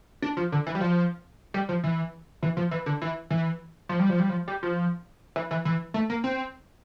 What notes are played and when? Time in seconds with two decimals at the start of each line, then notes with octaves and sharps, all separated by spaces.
0.22 D4
0.37 F3
0.52 D3
0.67 E3
0.75 G3
0.81 F3
1.54 G3
1.69 F3
1.84 E3
2.43 E3
2.57 F3
2.71 E3
2.86 D3
3.02 E3
3.30 E3
3.89 F3
3.99 G3
4.09 F3
4.19 G3
4.29 F3
4.48 G3
4.63 F3
5.36 E3
5.51 E3
5.65 E3
5.94 A3
6.10 A#3
6.24 C4